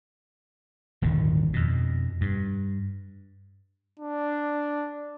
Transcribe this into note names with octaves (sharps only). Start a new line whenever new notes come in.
D#1 G#1 D#2 D3
F2 B2
G2
D4